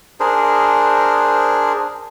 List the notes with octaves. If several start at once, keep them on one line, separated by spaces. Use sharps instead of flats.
D4 G#4 A#4 C5